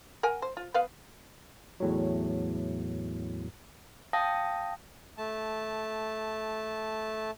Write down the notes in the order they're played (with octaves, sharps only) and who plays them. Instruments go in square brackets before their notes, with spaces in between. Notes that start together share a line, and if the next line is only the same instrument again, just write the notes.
[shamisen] A#4 F#5 G#5
C5
F4
B3 B4 F5
[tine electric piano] E2 A2 F#3
[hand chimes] F5 G5 A5 D#6 A#6
[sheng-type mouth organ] A3 A5